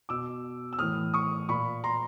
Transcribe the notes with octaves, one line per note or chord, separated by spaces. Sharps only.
B2 D6 E6
E6
A2 E3 D#6 F6
C#6 D#6
A#2 B5 C#6
A#5 C6